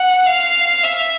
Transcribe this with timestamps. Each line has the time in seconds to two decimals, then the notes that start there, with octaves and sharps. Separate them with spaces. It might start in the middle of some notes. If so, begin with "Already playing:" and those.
Already playing: F#5
0.26 F5
0.84 E5